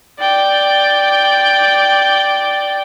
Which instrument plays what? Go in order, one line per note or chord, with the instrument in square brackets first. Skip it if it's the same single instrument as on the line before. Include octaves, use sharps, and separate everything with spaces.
[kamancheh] D5 G5